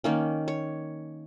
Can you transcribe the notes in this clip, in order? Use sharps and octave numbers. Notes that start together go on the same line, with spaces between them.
D#3 A#3 C#4
C#5